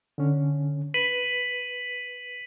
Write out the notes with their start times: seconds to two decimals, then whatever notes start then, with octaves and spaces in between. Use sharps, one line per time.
0.18 D3 C#4
0.94 B4 B6 D#7 F#7